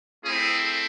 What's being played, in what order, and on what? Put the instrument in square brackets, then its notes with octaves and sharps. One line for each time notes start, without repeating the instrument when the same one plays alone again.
[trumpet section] A3 C4 E4 G#4